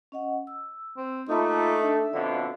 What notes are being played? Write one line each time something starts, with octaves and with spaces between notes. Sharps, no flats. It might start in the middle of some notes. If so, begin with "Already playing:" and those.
C#4 D#5 F#5
E6
C4
A3 A#3 D#4 F4 E5 B5
D4 E5
F2 B2 D3 D5 F5